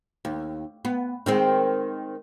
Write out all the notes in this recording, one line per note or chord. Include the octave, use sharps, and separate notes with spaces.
D#2
B3
D#3 G#3 C4